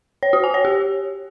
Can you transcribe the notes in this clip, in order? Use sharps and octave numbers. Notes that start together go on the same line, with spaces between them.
C#5
F#4
G#5
C#5
G4